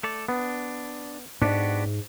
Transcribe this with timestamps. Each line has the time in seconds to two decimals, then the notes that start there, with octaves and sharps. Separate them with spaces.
0.03 A3 A4 D5
0.29 B3 D4
1.42 G#2 B3 D4 F#4 G4